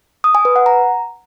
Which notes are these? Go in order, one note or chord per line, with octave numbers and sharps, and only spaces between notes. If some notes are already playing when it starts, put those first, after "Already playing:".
D#6
G#5
B4
F#5
A#5